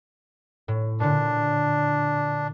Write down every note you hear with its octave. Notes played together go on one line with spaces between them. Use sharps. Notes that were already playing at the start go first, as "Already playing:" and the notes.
A2
A#2 D3 D4